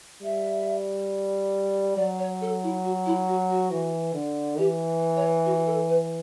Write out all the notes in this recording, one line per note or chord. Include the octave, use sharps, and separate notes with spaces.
G3 E5
F#3 D5
C#5
A4
E4
F#4
E4
F#4
F#4
E3
D3
E3 G4
C#5
F#4
A4
B4